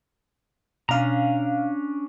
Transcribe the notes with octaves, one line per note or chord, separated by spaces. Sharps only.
B2 C#4 D4 F5 A#5